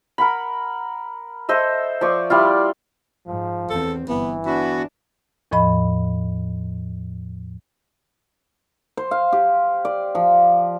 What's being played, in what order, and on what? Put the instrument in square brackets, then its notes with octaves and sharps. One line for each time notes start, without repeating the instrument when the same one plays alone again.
[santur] A#4 F#5 B5
A4 C5 D#5 E5
F3 D5 C#6
G3 E4 F4
[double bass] G#2 [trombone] F3
[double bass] E2 C4 [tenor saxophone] A4
[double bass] G1 [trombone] E3 [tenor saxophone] B3
[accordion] B3 F#4 [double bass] D4 [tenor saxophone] E4
[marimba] E2 A2 F3 D#5 B5
[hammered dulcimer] C5
F5
G4
D5
F3